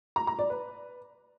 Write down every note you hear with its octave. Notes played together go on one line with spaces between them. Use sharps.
A#5
A#5
D5
B4